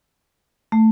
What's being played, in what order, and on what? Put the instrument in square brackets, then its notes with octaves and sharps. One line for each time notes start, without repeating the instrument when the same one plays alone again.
[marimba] A3